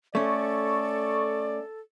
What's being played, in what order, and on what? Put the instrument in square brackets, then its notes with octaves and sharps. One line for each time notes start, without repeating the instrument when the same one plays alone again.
[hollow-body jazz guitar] A3 C#4 [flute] A4 [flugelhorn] D5 [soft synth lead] C#6